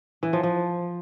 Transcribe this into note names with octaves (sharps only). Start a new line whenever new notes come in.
E3
F3
F3